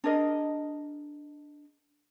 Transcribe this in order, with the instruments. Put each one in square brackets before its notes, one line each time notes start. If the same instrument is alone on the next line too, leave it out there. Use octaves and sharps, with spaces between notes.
[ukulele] D4 G#4 A#4 D#5